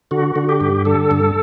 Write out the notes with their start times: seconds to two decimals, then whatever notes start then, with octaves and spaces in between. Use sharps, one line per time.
0.11 D3 F#4
0.36 D3
0.49 G4
0.60 G2
0.85 D3 A4
1.11 G2